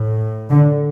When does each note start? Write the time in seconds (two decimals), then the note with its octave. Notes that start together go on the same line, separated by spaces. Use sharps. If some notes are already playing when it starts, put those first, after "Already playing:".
Already playing: A2
0.50 D3